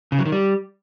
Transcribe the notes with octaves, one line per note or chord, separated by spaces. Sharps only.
C#3
F#3
D#3
G3